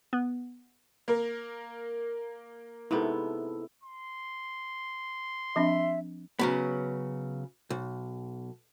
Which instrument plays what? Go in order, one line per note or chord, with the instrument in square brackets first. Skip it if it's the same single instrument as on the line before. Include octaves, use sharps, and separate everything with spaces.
[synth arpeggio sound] B3
[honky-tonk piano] A#3 A#4
[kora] G#2 C3 B3 [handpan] E4 A4
[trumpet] C6
[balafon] F3 C4 D4 [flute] E5
[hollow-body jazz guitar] C#3 F#3 B3
B1